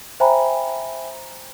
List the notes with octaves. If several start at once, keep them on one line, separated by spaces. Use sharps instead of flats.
C5 E5 G5 G#5 A#5 B5